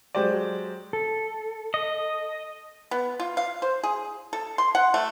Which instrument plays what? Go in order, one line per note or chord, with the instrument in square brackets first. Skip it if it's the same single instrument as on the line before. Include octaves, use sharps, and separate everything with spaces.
[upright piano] F#3 G#3 G4 C5 D5
[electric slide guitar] A4
[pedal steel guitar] D#5
[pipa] B3
F4
F5
C5
G#4
A4
C6
F#5
A3